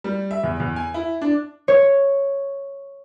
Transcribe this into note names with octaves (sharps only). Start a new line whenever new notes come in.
G3
E5
E2
E2
G#5
E4
D4
C#5